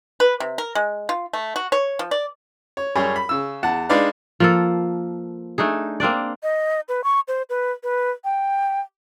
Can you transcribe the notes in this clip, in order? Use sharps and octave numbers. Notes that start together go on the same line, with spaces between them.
B4
C3
A#4
G#3
F4
A3
F#4
C#5
F3
D5
C#5
F#2 G3 G#4 C#5
B5
C#3 E6
E2 F#5 A5
G#3 D4 D#4 B4 D5 F5
F3 A#3 A4
A3 D4 D#4 G#4
A#3 C4 D4 D5
D#5
B4
C#6
C5
B4
B4
G5